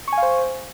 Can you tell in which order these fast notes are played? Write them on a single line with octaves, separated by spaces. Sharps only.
C#6 G#5 F5 C5